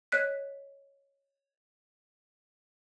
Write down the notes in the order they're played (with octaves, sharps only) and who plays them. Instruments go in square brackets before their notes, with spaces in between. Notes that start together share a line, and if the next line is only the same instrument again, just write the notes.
[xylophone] C#5 D#5 F#6 B6